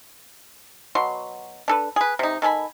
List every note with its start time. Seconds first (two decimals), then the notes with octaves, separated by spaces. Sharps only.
0.95 B2 F#3 C6
1.68 D4 A4 B4
1.96 G#4 B4
2.19 C3 D#4
2.42 D#3 A4 G#5 B5